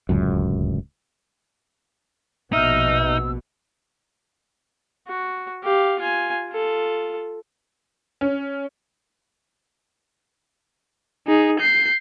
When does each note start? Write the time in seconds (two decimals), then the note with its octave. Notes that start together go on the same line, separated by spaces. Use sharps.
0.09 D1 C#2 F#2
2.53 A#1 B2 D#4 E5 E6 F6 G6
5.08 F#4
5.64 G4 F5
5.99 F4 G#5
6.49 F4 A4
8.21 C#4
11.27 D#4 G#4
11.59 G6 C7